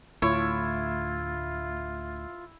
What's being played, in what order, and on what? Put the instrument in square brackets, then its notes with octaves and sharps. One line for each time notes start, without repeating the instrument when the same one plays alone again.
[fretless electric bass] D2 A2 [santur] E4 [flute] F4 [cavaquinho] C#5